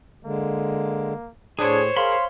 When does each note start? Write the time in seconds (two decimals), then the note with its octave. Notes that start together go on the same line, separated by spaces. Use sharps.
0.25 D3 G#3 A#3
1.59 A2 D4 G#4 C5 C#5
1.96 G#4 A#4 F5 B5 C6